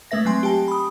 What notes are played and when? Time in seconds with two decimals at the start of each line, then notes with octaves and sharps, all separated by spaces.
0.11 G#3 A3 B4 E5 A#6
0.25 F#3 C4 G#5 C6
0.43 G4 G5 A5
0.68 B5 D#6